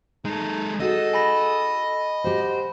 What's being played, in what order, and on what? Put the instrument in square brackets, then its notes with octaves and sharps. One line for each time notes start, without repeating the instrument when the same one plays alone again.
[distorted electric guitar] G#3 A4 [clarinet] D#4
[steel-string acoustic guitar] D#4 F#4 G#4 [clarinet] A4 [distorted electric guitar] D#5
[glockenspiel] G#5 B5 A#6
[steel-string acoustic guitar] F#4 G4 [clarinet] C5